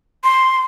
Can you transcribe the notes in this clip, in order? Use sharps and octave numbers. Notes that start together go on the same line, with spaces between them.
C6